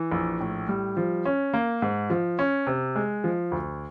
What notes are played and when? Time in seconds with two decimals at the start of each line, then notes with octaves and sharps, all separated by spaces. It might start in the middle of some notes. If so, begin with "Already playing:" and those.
Already playing: E3
0.12 A#1
0.41 A2
0.69 G3
0.97 F3
1.25 C#4
1.54 A#3
1.82 G#2
2.10 F3
2.39 C#4
2.67 C3
2.96 G#3
3.24 F3
3.51 D2